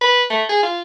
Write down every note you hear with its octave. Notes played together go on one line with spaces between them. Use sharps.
B4
A3
G#4
F4